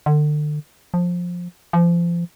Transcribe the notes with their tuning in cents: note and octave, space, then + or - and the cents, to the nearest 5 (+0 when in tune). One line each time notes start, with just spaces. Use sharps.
D3 +35
F3 +15
F3 -30